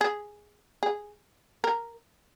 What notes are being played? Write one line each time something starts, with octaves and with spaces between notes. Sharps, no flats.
G#4
G#4
A#4